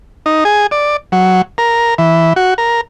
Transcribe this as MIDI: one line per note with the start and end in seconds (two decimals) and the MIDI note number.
0.26 0.44 63
0.45 0.67 68
0.71 0.97 74
1.12 1.42 54
1.58 1.94 70
1.98 2.33 52
2.36 2.54 66
2.58 2.81 70